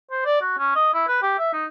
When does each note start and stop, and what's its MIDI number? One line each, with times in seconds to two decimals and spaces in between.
0.11 0.23 72
0.25 0.41 74
0.41 0.54 66
0.58 0.73 61
0.75 0.91 75
0.94 1.07 64
1.08 1.21 71
1.22 1.35 67
1.39 1.50 76
1.53 1.65 63